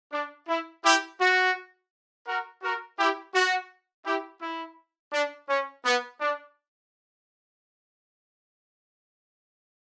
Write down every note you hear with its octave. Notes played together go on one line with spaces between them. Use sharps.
D4
E4
E4 G4
F#4
F#4 A#4
F#4 A#4
E4 G4
F#4
E4 G4
E4
D4
C#4
B3
D4